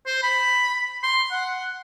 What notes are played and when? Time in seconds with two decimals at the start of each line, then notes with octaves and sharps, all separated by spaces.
0.06 C5
0.23 B5
1.03 C6
1.31 F#5